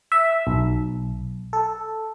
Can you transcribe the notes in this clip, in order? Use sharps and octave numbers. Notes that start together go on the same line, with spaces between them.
E5
B1
A4